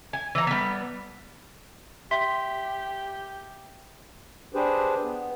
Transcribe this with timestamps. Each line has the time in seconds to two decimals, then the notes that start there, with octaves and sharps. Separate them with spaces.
0.13 G#5
0.35 E3 A#5
0.47 G3 B3
2.11 G4 E5 C6 B6
4.54 D4 G4 G#4 B4 C5
5.03 B3